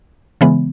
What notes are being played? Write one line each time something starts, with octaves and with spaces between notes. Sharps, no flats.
C#3 E3 G#3 B3